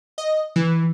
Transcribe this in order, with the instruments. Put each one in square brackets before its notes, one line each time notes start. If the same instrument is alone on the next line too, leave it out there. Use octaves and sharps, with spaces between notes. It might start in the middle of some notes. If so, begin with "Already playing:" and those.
[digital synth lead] D#5
E3